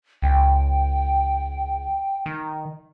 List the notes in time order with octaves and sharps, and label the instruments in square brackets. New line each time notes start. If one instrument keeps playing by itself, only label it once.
[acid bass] C#2 [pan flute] G5
[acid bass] D#3